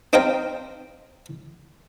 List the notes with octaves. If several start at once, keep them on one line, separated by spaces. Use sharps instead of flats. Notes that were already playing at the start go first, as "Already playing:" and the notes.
C4 D#4 C5 F5 G5 A#5